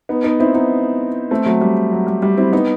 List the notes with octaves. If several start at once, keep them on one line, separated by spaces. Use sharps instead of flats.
B3 D#4
B3 D#4
C4 E4
B3 D#4
A3 C4
F#3 A3
G3
F#3
G3
G3
C4 E4
B3 D#4